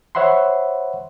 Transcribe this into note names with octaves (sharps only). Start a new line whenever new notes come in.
C5 C#5 E5 F#5 B5 C6